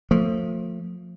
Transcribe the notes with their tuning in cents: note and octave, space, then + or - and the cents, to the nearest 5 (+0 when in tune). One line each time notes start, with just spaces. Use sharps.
F3 +25 A3 +35